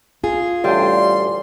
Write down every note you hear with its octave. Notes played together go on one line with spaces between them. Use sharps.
F4 G#4
A1 D2 G3 C6